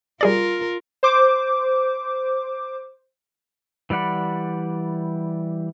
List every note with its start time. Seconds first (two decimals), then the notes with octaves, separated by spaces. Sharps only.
0.21 G3 F4 G#4 A#4 D5
1.03 C5 D6
3.90 E3 G3 D5 F#5 B5